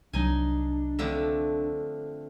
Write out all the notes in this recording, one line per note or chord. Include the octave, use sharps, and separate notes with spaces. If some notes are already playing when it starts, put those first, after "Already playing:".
C2 F#3 D4 D#4 G#5
F2 D3 A3